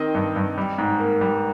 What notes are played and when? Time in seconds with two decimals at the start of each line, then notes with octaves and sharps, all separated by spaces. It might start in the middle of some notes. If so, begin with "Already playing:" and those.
Already playing: D#3 C4 D#5
0.15 G2
0.36 G2
0.58 G3
0.78 G#2
0.99 A#3
1.21 G3